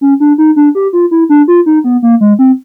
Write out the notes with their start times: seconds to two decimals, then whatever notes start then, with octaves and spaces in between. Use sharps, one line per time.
0.01 C#4
0.20 D4
0.38 D#4
0.56 D4
0.75 G4
0.93 F4
1.11 E4
1.29 D4
1.48 F4
1.66 D#4
1.84 B3
2.02 A#3
2.21 G#3
2.39 C4